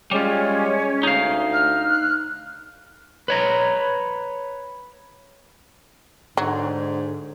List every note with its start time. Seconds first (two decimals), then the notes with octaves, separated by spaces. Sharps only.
0.11 G3 G#3 C#4 F4 C#5
1.03 D2 D#4 F5
1.53 F6
1.89 F#6
3.28 B4 C#5 A#5
6.37 G#2 D3 F#3